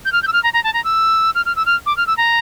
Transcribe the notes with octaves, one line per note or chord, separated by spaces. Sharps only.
G6
F6
G6
E6
F6
A#5
A#5
A5
A#5
E6
F6
F6
E6
F6
D6
F6
E6
A#5